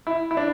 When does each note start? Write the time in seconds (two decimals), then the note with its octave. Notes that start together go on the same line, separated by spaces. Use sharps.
0.07 E4
0.31 E4
0.37 D4